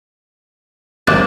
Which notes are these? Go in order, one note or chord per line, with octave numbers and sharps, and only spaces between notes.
G1 E2 F3 A#3 D6 F#6 A6